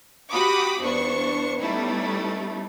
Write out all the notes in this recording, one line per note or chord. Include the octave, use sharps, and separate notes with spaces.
F#4 G4 B5 D6 D#6
E2 G2 D4 C5 C#6
G3 A3 B3 C#4 D#4 E4